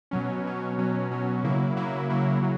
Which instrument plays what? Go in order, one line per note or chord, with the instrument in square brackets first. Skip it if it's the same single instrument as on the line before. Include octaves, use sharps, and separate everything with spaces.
[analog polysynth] B2 F#3 C#4
B2 F#3 C#4
B2 F#3 C#4
B2 F#3 C#4
C#3 F#3 A#3 E4
C#3 F#3 A#3 E4
C#3 F#3 A#3 E4
C#3 F#3